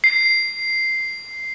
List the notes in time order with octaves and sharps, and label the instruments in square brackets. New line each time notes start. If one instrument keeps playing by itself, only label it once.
[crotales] C7